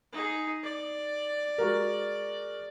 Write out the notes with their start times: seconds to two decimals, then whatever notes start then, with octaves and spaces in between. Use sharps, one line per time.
0.12 D#4 G#4
0.63 D5
1.58 G#3 F#4 A#4